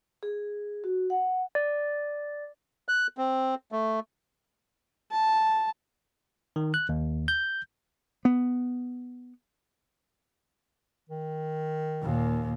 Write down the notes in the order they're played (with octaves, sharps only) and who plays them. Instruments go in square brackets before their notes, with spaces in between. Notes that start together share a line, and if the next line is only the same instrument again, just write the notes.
[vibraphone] G#4
F#4
F#5
[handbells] D5
[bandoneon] F#6
C4
A3
[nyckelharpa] A5
[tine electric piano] D#3
F#6
D#2
G6
[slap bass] B3
[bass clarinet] D#3
[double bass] D#2 A#2